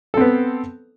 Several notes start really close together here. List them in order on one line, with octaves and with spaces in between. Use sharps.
A4 C4 B3